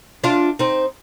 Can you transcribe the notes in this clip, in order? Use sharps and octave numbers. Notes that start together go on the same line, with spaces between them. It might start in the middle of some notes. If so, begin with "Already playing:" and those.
D4 F4
C4 D#4